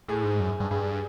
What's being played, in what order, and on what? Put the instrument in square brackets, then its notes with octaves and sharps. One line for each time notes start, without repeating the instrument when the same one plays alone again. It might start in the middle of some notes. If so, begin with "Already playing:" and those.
[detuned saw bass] A2 [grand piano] G#4
[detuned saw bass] G#2
F#2
G2
[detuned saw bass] G2 [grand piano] G#4